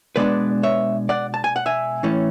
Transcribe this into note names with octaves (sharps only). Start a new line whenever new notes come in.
B2 G#3 B3 D4 B4 D5
C#5 E5
D5 F#5
A5
G#5
F#5
E5 G#5
A2 E3 A3 C#4